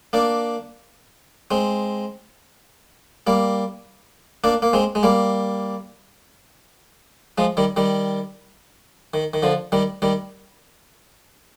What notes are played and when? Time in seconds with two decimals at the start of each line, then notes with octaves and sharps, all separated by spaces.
0.13 A#3 D4
1.51 G#3 C4
3.27 G3 A#3
4.44 A#3 D4
4.62 A#3
4.73 G#3 C4
4.95 G#3
5.03 G3 A#3
7.38 F3 G#3
7.57 D#3 G3
7.76 D#3 G3
9.14 D#3
9.33 D#3
9.43 D3 F3
9.72 D#3 G3
10.02 D#3 G3